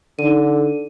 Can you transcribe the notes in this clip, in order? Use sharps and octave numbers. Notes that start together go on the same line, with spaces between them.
D3 D#4 D#7